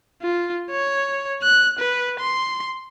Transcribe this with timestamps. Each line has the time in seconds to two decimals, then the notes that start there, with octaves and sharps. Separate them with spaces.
0.22 F4
0.71 C#5
1.42 F#6
1.79 B4
2.20 C6